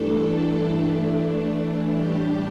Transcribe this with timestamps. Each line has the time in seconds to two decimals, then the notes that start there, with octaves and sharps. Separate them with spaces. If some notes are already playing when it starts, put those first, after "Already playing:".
Already playing: G2 E3 A3 D4 A4
0.77 E3 A3 D4
1.92 A2 G3 D4 G4